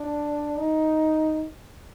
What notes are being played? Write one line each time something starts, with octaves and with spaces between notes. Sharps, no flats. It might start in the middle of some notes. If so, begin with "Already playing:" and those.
Already playing: D4
D#4